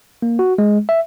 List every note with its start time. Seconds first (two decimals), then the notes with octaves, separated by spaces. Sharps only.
0.22 A#3
0.39 F#4
0.58 G#3
0.89 E5